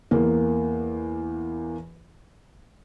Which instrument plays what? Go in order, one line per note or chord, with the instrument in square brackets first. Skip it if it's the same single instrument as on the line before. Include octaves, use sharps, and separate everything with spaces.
[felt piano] E2 A#3